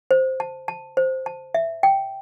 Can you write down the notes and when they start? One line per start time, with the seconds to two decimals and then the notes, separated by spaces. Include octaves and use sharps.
0.11 C5
0.40 A5
0.68 A5
0.97 C5
1.26 A5
1.54 E5
1.83 G5